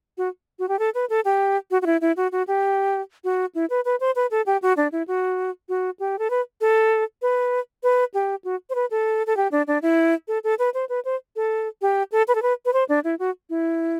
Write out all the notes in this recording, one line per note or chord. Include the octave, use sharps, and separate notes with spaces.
F#4
F#4
G4
A4
B4
A4
G4
F#4
F#4
E4
E4
F#4
F#4
G4
F#4
E4
B4
B4
C5
B4
A4
G4
F#4
D4
E4
F#4
F#4
G4
A4
B4
A4
B4
B4
G4
F#4
C5
B4
A4
A4
G4
D4
D4
E4
A4
A4
B4
C5
B4
C5
A4
G4
A4
B4
A4
B4
B4
C5
D4
E4
F#4
E4